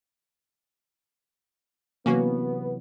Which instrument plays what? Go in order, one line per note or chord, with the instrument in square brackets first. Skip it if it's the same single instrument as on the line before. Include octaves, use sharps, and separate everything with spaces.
[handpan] C3 E3 F#3 [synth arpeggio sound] A#3 C#4 F#4 [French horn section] B3